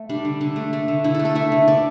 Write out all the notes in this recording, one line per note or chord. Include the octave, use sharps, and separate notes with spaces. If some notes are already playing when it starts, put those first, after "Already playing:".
Already playing: A3
G3 D4
D3
D3
A3
A3
D3
D3 E4
A3 A4
A4
A3 E5
D3
D3 D5